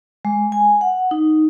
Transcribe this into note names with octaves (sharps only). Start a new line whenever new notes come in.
G#3
G#5
F#5
D#4